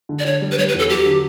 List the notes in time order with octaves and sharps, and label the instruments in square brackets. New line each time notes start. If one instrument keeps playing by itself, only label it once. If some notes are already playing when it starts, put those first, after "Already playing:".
[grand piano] D3
[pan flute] D5
[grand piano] D3 [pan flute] C#5
[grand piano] G3
[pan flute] B4
[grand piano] G3 [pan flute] C#5
[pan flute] B4
[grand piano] E2 [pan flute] A4
[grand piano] F#3 [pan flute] G4
[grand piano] D3